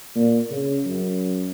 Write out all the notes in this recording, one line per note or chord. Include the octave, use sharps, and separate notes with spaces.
A#2
C#3
F#2